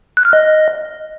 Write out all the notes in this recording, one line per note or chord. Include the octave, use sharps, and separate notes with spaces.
F#6
F6
D#5